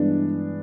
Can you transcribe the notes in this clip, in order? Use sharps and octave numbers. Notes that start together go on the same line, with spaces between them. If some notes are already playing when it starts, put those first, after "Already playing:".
Already playing: G2 E3 G#3 B3 D4